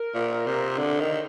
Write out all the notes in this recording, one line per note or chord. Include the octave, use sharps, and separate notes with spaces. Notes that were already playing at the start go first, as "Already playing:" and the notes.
Already playing: A#4
A#2
C3
D3
D#3